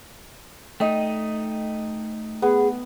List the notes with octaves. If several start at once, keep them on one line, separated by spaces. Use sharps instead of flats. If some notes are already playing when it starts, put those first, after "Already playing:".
A3 D#4 D#5 G5
B3 G#4